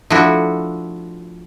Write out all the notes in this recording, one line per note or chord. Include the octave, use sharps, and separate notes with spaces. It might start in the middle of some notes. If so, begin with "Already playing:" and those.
F3 A3 D4 E4 F#4